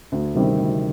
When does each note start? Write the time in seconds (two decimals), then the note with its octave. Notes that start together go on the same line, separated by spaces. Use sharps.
0.12 D2
0.35 C3 D#3 G3 C4
0.58 D2